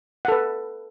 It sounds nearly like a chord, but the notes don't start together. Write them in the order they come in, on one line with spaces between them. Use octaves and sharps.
F#5 A4 B4